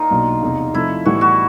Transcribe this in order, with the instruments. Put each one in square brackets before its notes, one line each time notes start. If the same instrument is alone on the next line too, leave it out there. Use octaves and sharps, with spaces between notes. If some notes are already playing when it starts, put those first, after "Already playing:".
Already playing: [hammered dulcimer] D#4 F4
[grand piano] B1 A#2 F#3 A#3 D4
F1 E2 C3
[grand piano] C3 F3 A3 [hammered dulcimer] E4
[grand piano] A2 E3 G3 B3 [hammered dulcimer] F#4
[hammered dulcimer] F#4